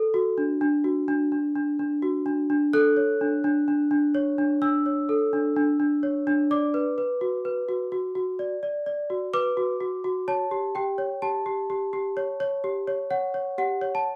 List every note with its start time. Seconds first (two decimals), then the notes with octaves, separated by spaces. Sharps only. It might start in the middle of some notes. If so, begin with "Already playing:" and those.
Already playing: A4
0.14 F#4
0.38 D4
0.61 D4
0.84 F#4
1.08 D4
1.32 D4
1.56 D4
1.79 D4
2.02 F#4
2.26 D4
2.50 D4
2.73 A4 F#6
2.97 C#5
3.21 D4
3.44 D4
3.68 D4
3.91 D4
4.15 C#5
4.38 D4
4.62 D4 E6
4.86 C#5
5.09 A4
5.33 D4
5.56 D4
5.80 D4
6.03 C#5
6.27 D4
6.51 D5 D6
6.74 B4
6.98 B4
7.21 F#4
7.45 B4
7.69 F#4
7.92 F#4
8.15 F#4
8.39 D5
8.63 D5
8.86 D5
9.10 F#4
9.33 B4 D6
9.57 F#4
9.80 F#4
10.04 F#4
10.28 C#5 A5
10.51 G4
10.75 G4 G5
10.98 C#5
11.22 G4 A5
11.46 G4
11.70 G4
11.93 G4
12.17 C#5
12.40 C#5
12.64 G4
12.88 C#5
13.10 C#5 F#5
13.34 C#5
13.58 G4 F#5
13.81 C#5
13.95 A5